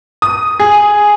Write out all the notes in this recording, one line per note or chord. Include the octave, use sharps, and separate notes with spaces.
D#6
G#4